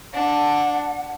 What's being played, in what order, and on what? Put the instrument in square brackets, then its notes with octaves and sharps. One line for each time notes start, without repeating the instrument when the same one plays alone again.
[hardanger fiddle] D4 [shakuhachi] F#5 [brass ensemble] A5